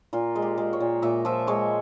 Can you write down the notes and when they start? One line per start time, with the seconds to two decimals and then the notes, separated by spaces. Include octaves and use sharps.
0.13 A#2 F4
0.35 G#3
0.42 G4
0.58 G#3
0.73 C#5
0.80 A#2
1.02 A#2 E5
1.25 F3 E5
1.47 G#3 C#5